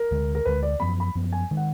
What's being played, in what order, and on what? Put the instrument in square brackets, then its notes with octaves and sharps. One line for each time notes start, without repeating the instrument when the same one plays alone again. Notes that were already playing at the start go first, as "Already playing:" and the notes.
Already playing: [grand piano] A#4
[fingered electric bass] D2 D3 G#3
[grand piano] A#4
[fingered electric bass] D2 D3 G#3 [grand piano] B4
[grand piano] D5
[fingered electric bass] F#2 F3 B3 [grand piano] B5
[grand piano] B5
[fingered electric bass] F#2 F3 B3
[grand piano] G#5
[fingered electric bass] D#3 G#3
[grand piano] F#5